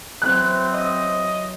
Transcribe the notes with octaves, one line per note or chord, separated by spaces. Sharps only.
E3 F#3 C4 F#6
D#5 C6